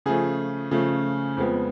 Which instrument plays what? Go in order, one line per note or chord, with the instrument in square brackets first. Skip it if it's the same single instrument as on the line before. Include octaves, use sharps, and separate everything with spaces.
[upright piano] C#3 F3 A3 G#4
C#3 F3 A3
F2 F3 G#3 B3